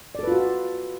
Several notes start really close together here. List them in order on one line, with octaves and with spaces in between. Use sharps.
D5 A4 B4 F4 F#4